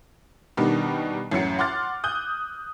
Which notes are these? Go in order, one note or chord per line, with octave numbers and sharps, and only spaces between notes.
B2 D#3 G3 B3 D4 D#4
A1 F#2 F#3 C#7
F#5 C6 D6 F6 A6
D#6 F#6 G6